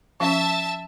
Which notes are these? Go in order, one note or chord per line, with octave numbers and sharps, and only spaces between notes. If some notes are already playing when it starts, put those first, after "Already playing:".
F3 C#4 E5 F5 A5 A6